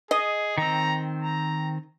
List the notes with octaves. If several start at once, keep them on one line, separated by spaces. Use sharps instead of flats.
G#4 D#5
D#3 C4 A#5
A#5